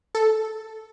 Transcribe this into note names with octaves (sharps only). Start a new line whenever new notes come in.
A4